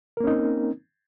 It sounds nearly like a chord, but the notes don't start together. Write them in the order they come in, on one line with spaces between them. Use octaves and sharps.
A#4 A#3 C#4 D#4 C4